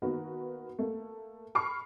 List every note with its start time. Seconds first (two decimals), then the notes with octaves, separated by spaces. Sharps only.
0.02 D#3 A#3 B3 F#4 A#4 B4
0.79 A3 A#3
1.55 B5 C#6 F6 C7